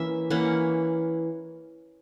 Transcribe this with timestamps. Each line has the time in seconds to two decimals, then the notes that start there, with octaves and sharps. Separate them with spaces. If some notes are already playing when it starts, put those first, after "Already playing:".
Already playing: E3 A#3 C#4 E5
0.30 E3 A#3 C#4 F#5